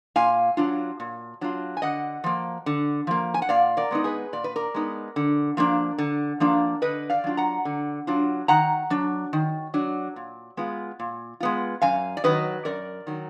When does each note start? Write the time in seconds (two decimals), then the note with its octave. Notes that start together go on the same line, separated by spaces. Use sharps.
0.16 A#2 F5 G#5
0.57 F#3 D4 F4
1.00 A#2
1.41 F#3 D4 F4
1.77 G#5
1.82 D3 D#5 F#5
2.24 F3 A#3
2.66 D3
3.07 F3 A#3
3.34 G#5
3.42 F#5
3.49 A#2 D5 F5
3.77 A#4 D5
3.91 G#3 B3 D#4
4.04 G#4 B4
4.33 A#2 D5
4.44 B4
4.56 A#4 D5
4.74 G#3 B3 D#4
5.16 D3
5.57 F3 A#3 D4
5.98 D3
6.40 F3 A#3 D4
6.82 D3 B4 D#5
7.10 D5 F5
7.24 F#3 D4 F4
7.37 F#5 A#5
7.65 D3
8.07 F#3 D4 F4
8.48 D#3 F#5 A#5
8.90 F#3 D4
9.33 D#3
9.74 F#3 D4
10.16 A#2
10.57 G#3 B3 F4
11.00 A#2
11.40 G#3 B3 F4
11.82 F#2 F5 G#5
12.17 D5
12.24 D#3 F#3 B4 D#5
12.65 F#2 A#4 D5
13.07 D#3 F#3